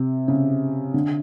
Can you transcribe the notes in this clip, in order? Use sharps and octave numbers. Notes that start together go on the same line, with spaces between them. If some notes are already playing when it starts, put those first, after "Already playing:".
Already playing: C3
C#3
D3